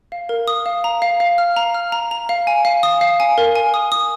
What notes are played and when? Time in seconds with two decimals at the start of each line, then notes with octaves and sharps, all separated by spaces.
0.12 F5
0.29 A#4
0.48 D#6
0.66 F5
0.84 A#5
1.02 F5
1.20 F5
1.38 F6
1.56 A#5
1.74 F6
1.92 A#5
2.11 A#5
2.29 F5
2.47 G#5
2.65 F5
2.83 D#6
3.01 F5
3.20 G#5
3.38 A#4
3.56 G#5
3.74 D#6
3.92 D#6